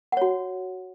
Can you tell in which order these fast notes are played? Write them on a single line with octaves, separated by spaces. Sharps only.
F#5 C#5 F#4